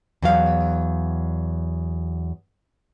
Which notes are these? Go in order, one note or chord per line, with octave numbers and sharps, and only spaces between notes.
E2 F#3 F5